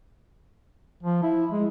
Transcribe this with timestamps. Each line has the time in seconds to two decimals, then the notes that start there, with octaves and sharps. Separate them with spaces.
1.03 F3
1.23 E4
1.51 G#3